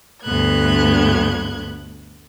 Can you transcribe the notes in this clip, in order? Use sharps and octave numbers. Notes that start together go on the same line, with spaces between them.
D2 G2 A3 B3 F#6 G#6